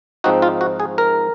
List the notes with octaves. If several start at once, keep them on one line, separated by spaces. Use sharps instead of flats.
G#2 F3 C4 D#4 F#4
F4
F#4
G#4
A#4